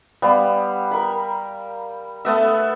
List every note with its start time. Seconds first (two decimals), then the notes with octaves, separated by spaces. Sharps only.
0.22 G3 B3 F5
0.91 A#4 B5
2.25 A3 B3 E5